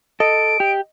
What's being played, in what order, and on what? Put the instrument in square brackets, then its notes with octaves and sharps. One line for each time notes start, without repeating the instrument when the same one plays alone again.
[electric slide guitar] A4 [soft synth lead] D#5 [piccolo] D7
[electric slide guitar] G4